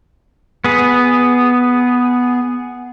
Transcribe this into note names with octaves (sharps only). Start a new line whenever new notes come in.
B3 G#4